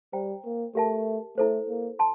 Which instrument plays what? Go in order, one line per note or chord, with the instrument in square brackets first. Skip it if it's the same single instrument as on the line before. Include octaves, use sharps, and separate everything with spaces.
[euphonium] G3 [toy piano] C5 G5 A#5
[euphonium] A#3
[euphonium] A3 [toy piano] G4 A#4 E5 A5
[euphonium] A3 [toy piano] E4 A4 C5
[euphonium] A#3
[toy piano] A5 C6